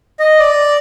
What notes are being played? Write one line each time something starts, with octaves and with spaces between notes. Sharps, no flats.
D#5
D5